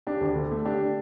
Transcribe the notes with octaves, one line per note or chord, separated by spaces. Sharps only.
D4 G4
D2
D3
A3
D4 G4